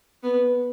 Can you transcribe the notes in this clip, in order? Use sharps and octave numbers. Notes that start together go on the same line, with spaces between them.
B3